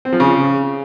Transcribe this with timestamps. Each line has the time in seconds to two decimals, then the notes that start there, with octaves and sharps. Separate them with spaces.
0.05 C4
0.13 F3
0.20 C#3